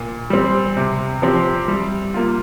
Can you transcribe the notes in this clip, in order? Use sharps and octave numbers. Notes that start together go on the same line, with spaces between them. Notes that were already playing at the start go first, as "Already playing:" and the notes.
Already playing: A#2
G3 C4
C3
F3 C4 G4
G3
A#3 F4